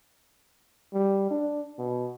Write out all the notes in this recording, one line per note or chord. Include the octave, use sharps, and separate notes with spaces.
G3
D4
B2